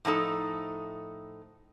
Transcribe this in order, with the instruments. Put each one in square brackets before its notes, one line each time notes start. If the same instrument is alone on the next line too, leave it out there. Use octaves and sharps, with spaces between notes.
[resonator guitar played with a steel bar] A2 F3 D#4 A4